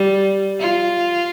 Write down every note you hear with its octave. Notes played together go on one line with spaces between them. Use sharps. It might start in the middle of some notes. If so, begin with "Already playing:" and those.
Already playing: G3
F4